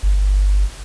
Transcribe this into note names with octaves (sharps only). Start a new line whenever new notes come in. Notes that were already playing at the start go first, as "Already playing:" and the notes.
G1